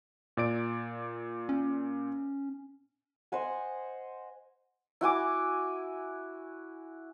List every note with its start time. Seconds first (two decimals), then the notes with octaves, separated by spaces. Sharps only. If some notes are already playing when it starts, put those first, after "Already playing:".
0.37 A#2 D5 D7
1.49 C#4
3.32 C5 D#5 F#5 G#5
5.01 E4 F#4 G#5 D6